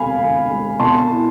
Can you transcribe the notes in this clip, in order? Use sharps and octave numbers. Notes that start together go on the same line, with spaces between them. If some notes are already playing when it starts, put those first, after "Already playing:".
Already playing: E1 D2 C3 F5 G#5 B5
D2
G#3
B2 A5 C6
E4